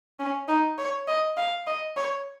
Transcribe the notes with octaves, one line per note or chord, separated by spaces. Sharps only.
C#4
D#4
C#5
D#5
F5
D#5
C#5